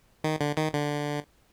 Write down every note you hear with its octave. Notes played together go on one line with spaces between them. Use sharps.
D#3
D3
D#3
D3